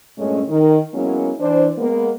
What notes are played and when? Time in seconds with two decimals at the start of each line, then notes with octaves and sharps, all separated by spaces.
0.18 G2 A#2 G#3 A3 C#4
0.49 D#3
0.93 F#3 G#3 A#3 B3 C#4 E4
1.40 E3 D4 C5
1.78 G#3 A#3 B3